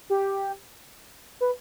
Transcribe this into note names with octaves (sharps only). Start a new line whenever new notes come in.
G4
B4